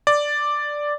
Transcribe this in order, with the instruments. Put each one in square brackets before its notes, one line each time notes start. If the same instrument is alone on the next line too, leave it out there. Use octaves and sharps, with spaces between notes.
[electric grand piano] D5